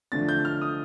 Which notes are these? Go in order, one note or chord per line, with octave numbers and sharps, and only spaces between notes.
D3 F3 A3 D4 A6
G6
F6
D#6